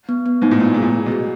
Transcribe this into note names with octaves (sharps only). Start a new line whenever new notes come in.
B3
B3
G#2 D#4
A2
A#2 B3
A#2 G#4
A2
G#4
B2
G#4